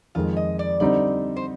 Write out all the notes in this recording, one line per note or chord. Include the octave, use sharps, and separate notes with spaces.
F2 D#3 G#3 F4
D#5
D5
D3 G3 C4 D#4 D5
C5